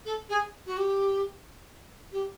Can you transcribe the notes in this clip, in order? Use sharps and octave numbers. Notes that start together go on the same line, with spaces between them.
A4
G#4
F#4
G4
G4